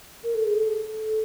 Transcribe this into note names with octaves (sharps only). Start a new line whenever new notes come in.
A#4
A4
G#4
A4